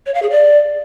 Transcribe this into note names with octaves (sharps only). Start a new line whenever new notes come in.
C#5
F5
G#4
D5